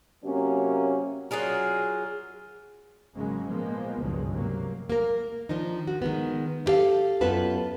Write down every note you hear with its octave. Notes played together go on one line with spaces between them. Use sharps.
C3 F#3 A#3 C#4
F#3 F4 G#4 A#4
G#1 C#3 F#3 G#3 A#3
A#2 F3 G#3 A#3 B3
F#1 C#2 G2 B2 F3 G#3
C3 F#3 A#3
A#3 A#4
D#3 F3 D4 D#4
F#4
D#3 G#3 B3
E4 G4 A4 F5
F#2 B3 F4 A4 B4 A5